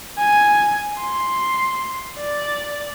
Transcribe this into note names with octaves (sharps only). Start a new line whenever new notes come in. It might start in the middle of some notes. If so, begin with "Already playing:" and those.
G#5
C6
D5